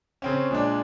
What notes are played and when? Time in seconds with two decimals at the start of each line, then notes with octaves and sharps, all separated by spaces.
0.22 C#3 C4 C#4
0.51 A#2 G#3 D4